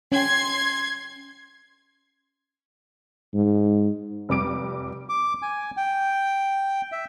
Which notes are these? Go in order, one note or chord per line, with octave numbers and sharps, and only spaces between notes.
C#4 G5 C6 G#6
G#2
F1 G3 D6 D7
D6
G#5
G5
E5